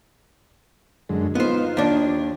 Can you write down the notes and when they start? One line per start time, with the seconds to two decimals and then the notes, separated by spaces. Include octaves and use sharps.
1.09 F#2 D3 G#3
1.35 B3 D#4 F4 C5
1.77 D#2 D4